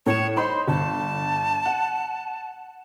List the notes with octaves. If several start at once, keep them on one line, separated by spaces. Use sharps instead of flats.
A2 C#5 E7
D#4 C5 B5 C6
G1 A5
F#5